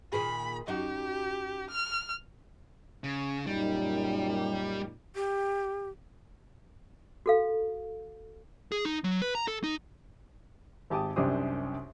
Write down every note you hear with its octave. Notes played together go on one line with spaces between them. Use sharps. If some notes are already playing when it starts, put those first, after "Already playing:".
A#2 D#3 G#4 B5
F#2 D#4 F#4 G4
F6
C#3
F#2 A#2 G3 D#4
G4
F#4 A4 F5
G#4
D#4
F#3
B4
A#5
A4
D#4
G#1 G4 A5 D6 D#6
C2 F#2 D4 G4 C5 D#6